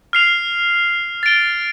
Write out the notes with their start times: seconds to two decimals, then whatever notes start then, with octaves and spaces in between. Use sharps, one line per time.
0.13 F6 C7 F7
1.23 A6 D7 G7